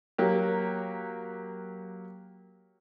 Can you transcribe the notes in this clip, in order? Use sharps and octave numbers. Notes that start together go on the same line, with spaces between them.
F#3 A#3 G4